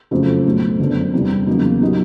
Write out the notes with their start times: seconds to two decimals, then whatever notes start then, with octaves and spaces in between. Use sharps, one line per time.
0.11 F#1 F2 C#3 F#3 A3
0.45 B1 A2 F#3
0.79 G1 F#2 D3
1.13 E2 C3 E3 G3 B3
1.47 E2 C#3 F#3 A#3 D#4
1.82 A#2 F#3 A#3 D#4 G4